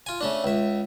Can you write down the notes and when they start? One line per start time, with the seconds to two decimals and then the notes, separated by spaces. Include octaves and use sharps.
0.06 F4 G#5
0.21 C#3 A3 D4
0.44 C#2 E5